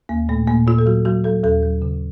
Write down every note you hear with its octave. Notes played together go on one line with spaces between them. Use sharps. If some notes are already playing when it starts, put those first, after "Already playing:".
D#2 A#3
A#2 A3
A#2 A#3
A#2 F4
A4
F#3 F#4
F#3 F#4
F#3 A4
D#2 A4
F#3
C#3